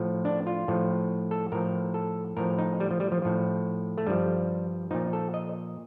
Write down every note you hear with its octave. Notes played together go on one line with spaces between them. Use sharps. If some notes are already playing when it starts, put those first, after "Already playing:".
Already playing: A2 F3
D4
F4
A2 F3
A4
A2 F3 A#4
A4
A2 F3 A#4
D#4
G3
F3
G3
F3
A2 F3
A3
G2 F3 G3
A#2 F3 D#4
A4
D#5